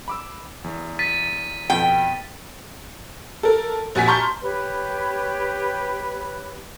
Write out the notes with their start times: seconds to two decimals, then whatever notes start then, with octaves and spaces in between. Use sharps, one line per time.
0.08 B5 D6 E6
0.64 E2
0.99 A6 B6 D#7
1.70 F2 B2 G5 G7
3.43 A4 A#4
3.95 A#1 F#4 G#5 B6
4.08 A5 A#5 C6 C#6 F6 G6
4.43 G4 B4 C#5 B5